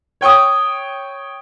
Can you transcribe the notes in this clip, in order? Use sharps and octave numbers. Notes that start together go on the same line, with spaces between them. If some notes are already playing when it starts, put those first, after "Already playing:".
C#5 G5 C#6 D#6